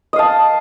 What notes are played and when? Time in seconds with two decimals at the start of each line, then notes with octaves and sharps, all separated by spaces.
0.13 D#5
0.16 F5
0.19 A5